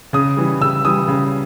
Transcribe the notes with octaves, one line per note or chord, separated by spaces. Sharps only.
C#3 D#6
E3 G3
C#3 E6
E3 G3 D#6
C#3